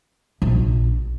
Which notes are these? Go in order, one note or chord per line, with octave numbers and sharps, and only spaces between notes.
A#1